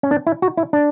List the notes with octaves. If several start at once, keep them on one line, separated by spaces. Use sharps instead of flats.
C#4
D4
E4
F#4
E4
D4